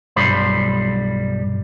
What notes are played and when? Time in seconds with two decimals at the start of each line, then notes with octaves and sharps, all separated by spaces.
0.16 B1 G2 G3 C5 B5